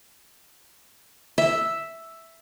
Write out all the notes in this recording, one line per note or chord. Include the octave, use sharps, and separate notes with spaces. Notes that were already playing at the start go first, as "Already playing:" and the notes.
E5